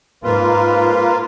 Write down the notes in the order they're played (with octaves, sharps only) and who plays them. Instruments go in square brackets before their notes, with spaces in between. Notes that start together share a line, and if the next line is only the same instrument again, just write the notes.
[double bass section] G#2 [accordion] A#3 F4 [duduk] B4